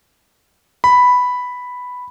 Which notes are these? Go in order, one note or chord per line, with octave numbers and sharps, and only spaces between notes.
B5